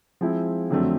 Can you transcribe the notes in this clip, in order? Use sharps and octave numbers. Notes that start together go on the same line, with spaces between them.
F3 G#3 C4 E4
F2 D3 F#3 A3 C4